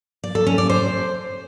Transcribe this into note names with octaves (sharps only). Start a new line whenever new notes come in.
D5
A4
C#4
D5
C5